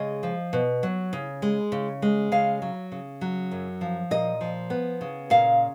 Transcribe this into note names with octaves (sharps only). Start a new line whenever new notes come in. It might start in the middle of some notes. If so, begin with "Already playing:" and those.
Already playing: C#3 G#3 D#5
F3
B2
F#3
C#3
G#3
C#3
G#3
C#3 F5
F#3
C#3
F#3
F#2
F3
A#2 D#5
F3
B3
C#3
A#2 F5